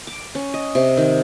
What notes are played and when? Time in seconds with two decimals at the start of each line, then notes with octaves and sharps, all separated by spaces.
0.07 D6
0.35 C#4
0.54 D#5
0.75 C3
0.97 D#3